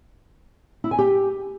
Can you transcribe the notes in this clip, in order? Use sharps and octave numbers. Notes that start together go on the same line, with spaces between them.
E4
G#5
G4